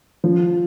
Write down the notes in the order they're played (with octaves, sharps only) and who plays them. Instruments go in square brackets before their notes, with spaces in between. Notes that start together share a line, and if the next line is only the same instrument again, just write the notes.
[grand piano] F3